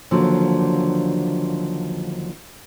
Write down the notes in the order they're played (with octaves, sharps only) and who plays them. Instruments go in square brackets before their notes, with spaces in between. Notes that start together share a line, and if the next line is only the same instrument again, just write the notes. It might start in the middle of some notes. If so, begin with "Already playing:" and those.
[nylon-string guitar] D#2 D3 F3 F#3